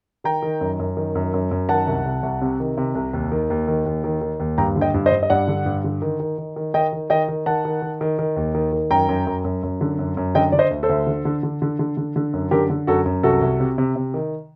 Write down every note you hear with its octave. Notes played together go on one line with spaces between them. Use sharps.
D#3 G5 A#5
D#3
F#2
F#2
D#3
F#2
F#2
F#2
D#3 F#5 A5
C2
C2
C2
C3
D#3
C3
C2
D#2
D#3
D#2
D#3
D#2
D#3
D#3
D#2
G2 G5 A#5
D3
D#5 G5
G2
C5 D#5
G2
D#5
G2 D5 F#5
D3
G2
D3
D#3
D#3
D#3
D#3
D#3 D#5 G5
D#3
D#3 D#5 G5
D#3
D#3 F#5 A5
D#3
D#3
D#3
D#3
D#2
D#3
D#3
F#2 G5 A#5
F#2
F#2
F#2
F#2
D3
F#2
F#2
D3 D#5 G5
D3 D5
C5 D#5
D2
A4 C5
D2
D3
D3
D3
D3
D3
D3
D3
F#2
D3 G4 A#4
D3
F#2 F#4 A4
F#2
C2 F#4 A4
C2
C3
C3
C3
D#3